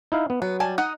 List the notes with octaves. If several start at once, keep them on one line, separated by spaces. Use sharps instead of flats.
D#4 E4 F5
B3
F#3 B3
G3 G#5 A5
D#4 D#5 F#5